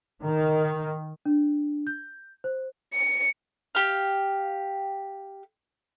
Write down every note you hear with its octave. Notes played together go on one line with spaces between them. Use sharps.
D#3
D4
G6
C5
C#7
G4 F5